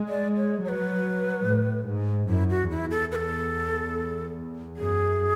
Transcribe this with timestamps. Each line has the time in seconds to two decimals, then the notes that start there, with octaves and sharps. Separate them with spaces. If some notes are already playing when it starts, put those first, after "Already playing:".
Already playing: G#3
0.09 D5
0.37 C#5
0.64 F#3 C#5
0.69 B4
1.47 A2
1.87 G#2
2.29 F#2 E4
2.50 F#4
2.70 E2 E4
2.91 A4
3.12 B4
3.15 A4
4.77 F#2 G#4